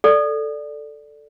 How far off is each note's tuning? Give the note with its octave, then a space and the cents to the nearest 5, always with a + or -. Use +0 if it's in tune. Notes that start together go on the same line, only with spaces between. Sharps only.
A4 +0 D5 +0